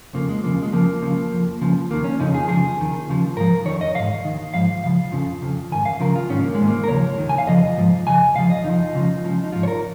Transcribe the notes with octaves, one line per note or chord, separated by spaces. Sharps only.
F2 C#3 F3 A#3
G#3
D#2 C#3 F3 A#3
G#3
F2 C#3 F3 A#3
C#2 C#3 F3
F2 F3
C#2 C#3 F3
D#2 D#3 A#3
C#4
F2 C#3 F3 D#4
G#4
C#2 C#3 F3 G#4
D#2 D#3
D#2 C#3 F3
G#2 F3 A#4
F2 D#3 C#5
D#5
G#2 D#3 F5
D#2 D#3
G#2 F3 F5
C#2 C#3 F3 F5
F2 C#3 F3
F2 C#3 F3
G#2 D#3 G#5
F5
C#2 C#3 F3 A#4
F4
G#2 D#3 C#4
A#3
G#3
G#2 D#3
A#3
A#4
D#2 C#3 F3 C#5
D#2 D#3
G#5
F5
F2 C#3 F3 D#5
G#2 F3
F2 C#3 G#5
C#2 C#3 F3 F5
D#5
F2 F3 D#4
C#2 C#3 F3
C#2 C#3 F3
D#4
G#2 F3 F4
C#5
A#4